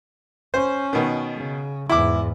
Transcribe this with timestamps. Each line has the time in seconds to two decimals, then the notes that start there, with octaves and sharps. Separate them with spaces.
0.54 C#4 C5
0.93 B2 D#3
1.36 C#3
1.89 E2 G#2 E4 D6